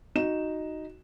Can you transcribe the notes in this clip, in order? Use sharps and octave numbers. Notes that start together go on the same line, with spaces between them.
D#4 F#4 E7